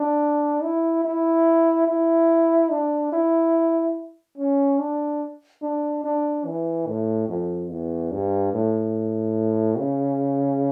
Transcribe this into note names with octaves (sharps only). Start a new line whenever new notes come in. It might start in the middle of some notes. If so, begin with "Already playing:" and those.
Already playing: D4
E4
E4
E4
D4
E4
C#4
D4
D4
D4
E3
A2
F2
E2
G2
A2
C#3